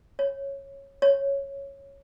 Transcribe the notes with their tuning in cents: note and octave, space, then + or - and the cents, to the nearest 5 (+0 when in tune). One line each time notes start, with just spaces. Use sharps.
C#5 -10
C#5 -5